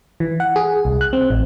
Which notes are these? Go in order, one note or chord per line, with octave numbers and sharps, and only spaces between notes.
E3
F#5
G#4
C2
F#6
C4
A1